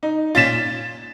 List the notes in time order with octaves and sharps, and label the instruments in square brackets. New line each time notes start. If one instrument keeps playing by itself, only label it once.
[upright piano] D#4
[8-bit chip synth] A#2 C#4 F4 [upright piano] A6 B6 E7